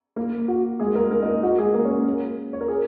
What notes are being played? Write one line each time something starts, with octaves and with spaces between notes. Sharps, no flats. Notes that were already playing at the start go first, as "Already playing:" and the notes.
A#3 A#4
F#4
G#3 G#4
A#3 A#4
A#3 A#4
D#4 D#5
F#4
G#3 G#4
A#3 A#4
C#4 C#5
C#5
A#4
G#4